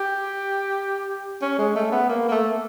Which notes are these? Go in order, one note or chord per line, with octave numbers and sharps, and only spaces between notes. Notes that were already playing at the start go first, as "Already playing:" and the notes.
Already playing: G4
C#4
G#3
A3
B3
A#3
A#3
A3